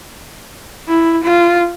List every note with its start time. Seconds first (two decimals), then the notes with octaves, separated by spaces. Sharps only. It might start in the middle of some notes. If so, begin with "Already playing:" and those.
0.88 E4
1.24 F4